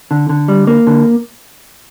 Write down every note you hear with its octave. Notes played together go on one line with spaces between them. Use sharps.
D3
D3
G3
A#3
D3